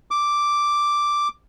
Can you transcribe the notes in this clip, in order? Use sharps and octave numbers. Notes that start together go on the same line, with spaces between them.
D6